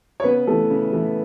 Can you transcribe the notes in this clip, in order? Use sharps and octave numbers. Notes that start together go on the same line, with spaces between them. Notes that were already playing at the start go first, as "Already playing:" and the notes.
C#5
C#3 B3 B4
E3 A3 A4
C#3
E3 A3